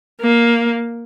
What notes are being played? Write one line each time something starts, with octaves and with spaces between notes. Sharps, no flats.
A#3